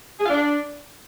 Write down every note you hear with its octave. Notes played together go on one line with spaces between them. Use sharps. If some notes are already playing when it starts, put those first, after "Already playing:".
G#4
F5
D4